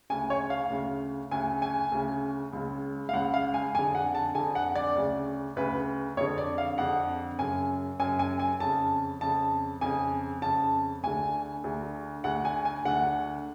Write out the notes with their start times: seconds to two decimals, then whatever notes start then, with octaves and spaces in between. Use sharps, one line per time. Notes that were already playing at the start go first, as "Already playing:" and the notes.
0.10 D2 C#3 G#5
0.30 C#5
0.50 F5
0.70 D2 C#3
1.31 D2 C#3 G#5
1.62 G#5
1.92 D2 C#3
2.53 C#2 C#3
3.09 F5
3.13 C#2 C#3 F#5
3.34 F5
3.54 G#5
3.74 F2 G#5
3.79 D3
3.95 F#5
4.15 A5
4.35 F2 D3 G#5
4.55 F#5
4.75 D5
4.95 D2 C#3
5.56 D2 C#3 B4
6.17 F2 C#5
6.21 D3
6.38 D5
6.58 F5
6.78 F2 D3 F#5
7.39 F#2 C#3 G#5
7.99 F#2 G#5
8.02 C#3
8.19 G#5
8.39 G#5
8.60 F2 C#3 A5
9.21 F2 C#3 A5
9.81 F2 C#3 G#5
10.42 F2 C#3 A5
11.03 D2 D3 G#5
11.64 D2 D3
12.24 D2 D3 F#5
12.45 G#5
12.65 G#5
12.85 D2 D3 F#5